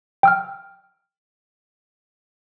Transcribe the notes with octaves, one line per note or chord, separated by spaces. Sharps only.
G5 E6 F6